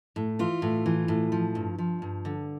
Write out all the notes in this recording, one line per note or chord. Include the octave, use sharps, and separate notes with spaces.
A2
E3 F4
A2
E3
A2
F3
G2
F3
G2
D3